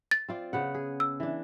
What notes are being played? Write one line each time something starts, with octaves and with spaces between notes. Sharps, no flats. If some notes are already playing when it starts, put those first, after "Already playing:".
A6
C4 F4 D5
C#3 B3 F#5
G#4
E6
E3 D4